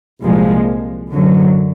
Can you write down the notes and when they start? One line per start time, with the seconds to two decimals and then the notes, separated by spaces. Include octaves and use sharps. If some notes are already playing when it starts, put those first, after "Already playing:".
0.23 C2 A#2 F3 G#3
1.11 F#2 D3 F#3